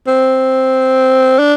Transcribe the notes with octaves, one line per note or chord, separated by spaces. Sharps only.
C4
D4